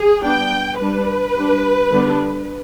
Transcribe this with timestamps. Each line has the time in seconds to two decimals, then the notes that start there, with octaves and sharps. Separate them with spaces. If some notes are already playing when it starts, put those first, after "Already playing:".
Already playing: G#4
0.23 G3 B3 D4 G5
0.79 G3 D4 B4
1.35 G3 D4
1.91 D3 G3 B3 D4